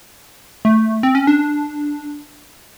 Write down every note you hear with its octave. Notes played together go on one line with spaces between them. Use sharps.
A3
C4
C#4
D4